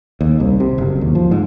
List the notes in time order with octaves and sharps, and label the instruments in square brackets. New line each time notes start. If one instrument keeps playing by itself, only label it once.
[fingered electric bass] D#2
C2
C3
F#1
D#2
F3
G#2